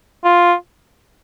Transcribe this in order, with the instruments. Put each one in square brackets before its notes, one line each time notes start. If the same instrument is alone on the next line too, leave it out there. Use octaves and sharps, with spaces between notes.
[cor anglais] F4